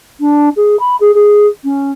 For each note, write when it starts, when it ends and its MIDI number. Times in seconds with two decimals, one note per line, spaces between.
0.20 0.49 62
0.56 0.78 68
0.79 0.95 83
1.00 1.11 68
1.14 1.46 68
1.63 1.91 61